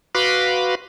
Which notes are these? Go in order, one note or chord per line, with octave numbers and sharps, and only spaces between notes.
F#4 B4 F5 B5 C6 D6